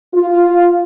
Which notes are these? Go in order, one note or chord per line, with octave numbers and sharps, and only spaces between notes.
F4